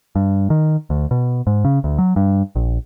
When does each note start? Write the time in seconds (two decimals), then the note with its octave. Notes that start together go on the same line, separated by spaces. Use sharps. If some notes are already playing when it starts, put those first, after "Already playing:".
0.16 G2
0.50 D#3
0.90 D2
1.11 B2
1.47 G#2
1.65 C#3
1.84 D2
1.98 F#3
2.16 G2
2.56 A#1